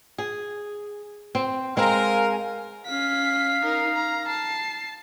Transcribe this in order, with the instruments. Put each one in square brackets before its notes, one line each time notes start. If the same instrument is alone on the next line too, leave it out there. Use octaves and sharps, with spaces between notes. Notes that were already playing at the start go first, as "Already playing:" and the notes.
[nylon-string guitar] G#4
C4
[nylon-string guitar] G#3 C4 [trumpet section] A#4 [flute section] F5 G#5
[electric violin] C#4 B6 [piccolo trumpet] F5
[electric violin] D#4 A#4
A#5
A5 C7